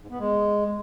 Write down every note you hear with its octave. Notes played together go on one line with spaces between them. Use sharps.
G#2
B3
G#3